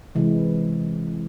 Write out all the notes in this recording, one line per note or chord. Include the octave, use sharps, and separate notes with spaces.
C3 E3 G#3